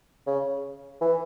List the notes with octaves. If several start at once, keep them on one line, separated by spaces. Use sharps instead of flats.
C#3
E3